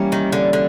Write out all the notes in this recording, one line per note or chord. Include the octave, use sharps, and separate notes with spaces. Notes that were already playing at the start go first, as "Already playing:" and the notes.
Already playing: E3 G3 A#3 C#4
D#3
D3
D3